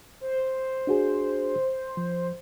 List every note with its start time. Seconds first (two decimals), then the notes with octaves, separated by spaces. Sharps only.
0.21 C5
0.87 D4 F#4 G#4
1.97 F3